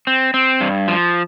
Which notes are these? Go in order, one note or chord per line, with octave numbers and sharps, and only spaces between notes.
C4
C4
G2
F3